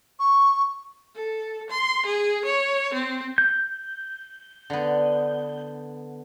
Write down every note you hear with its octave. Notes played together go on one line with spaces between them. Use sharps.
C#6
A4
C6
G#4
C#5
C4
G6
D3 B3